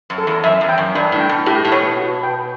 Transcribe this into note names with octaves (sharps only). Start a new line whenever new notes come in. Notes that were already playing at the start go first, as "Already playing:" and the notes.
F#2
A4
E2
F#2 E5
E2
G5
F#2
G2 D4
A2
G5
B2
A2 G4
A2
B2 C#5
F#4
G5